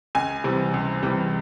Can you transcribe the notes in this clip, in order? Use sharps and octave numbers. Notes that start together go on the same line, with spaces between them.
C#2 G#5
C3 E3 G3
C#2
C3 E3 G3